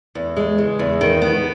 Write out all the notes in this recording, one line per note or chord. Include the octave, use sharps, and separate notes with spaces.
E2
G#3
C#3
E2
D#3
B3